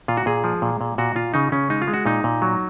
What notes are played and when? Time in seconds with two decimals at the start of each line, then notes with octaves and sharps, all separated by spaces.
0.08 A#2 F4
0.17 F#4
0.26 A#2 G#4
0.44 F3
0.62 A#2
0.81 A#2
0.98 A#2 F#4
1.16 A#2 F4
1.34 C#3 D#4
1.52 C#3 C#4
1.70 G#3 D#4
1.82 F4
1.88 G#3
1.94 F#4
2.06 A#2 D#4
2.24 A#2
2.42 F#3